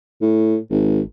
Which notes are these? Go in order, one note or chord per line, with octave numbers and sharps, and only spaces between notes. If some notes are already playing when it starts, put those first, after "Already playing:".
A2
G#1